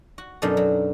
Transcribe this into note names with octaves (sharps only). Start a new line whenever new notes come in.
F#4
F#2 B2 D4 D#4 A4
F#3